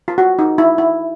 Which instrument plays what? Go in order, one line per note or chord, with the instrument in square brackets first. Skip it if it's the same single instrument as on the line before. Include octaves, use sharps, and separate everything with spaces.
[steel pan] F4
F#4
D#4
E4
E4